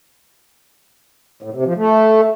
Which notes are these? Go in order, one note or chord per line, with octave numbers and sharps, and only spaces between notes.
A2
C3
F3
A3